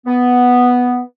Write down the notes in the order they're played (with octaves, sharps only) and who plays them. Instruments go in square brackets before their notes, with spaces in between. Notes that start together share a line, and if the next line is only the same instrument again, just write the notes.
[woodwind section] B3